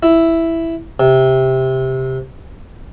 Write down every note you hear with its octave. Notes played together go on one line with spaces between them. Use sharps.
E4
C3